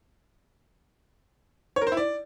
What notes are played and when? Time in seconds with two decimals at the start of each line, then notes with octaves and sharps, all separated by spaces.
1.76 C#5
1.82 A#4
1.87 C5
1.92 E4
1.97 D5